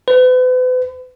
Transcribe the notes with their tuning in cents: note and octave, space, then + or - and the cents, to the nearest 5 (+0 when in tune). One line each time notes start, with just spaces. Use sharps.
B4 +40